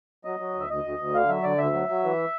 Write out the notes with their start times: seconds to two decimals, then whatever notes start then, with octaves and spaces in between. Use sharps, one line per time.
0.25 F#3 D#5
0.40 F#3
0.54 D2
0.61 E5
0.69 D2 D#5
0.84 D2
0.99 D2
1.14 D3 F5
1.29 F#3 E5
1.43 D3 D5
1.58 D2 E5
1.73 F#3
1.89 F#3
2.04 E3